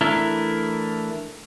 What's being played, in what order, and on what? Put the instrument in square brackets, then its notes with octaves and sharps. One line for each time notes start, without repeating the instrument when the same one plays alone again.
[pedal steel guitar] E3 A3 D4 E4 A#4